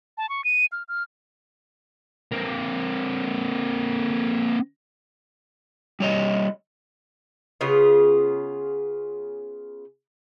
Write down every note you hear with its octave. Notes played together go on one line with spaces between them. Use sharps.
A5
C#6
D#7
F6
F6
A#3 C4
G3 C#5 D#5
C#3 B3 F4 G#4